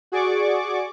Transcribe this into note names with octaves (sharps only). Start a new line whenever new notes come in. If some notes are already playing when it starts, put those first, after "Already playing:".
F#4 G#4 D5 C#6 D6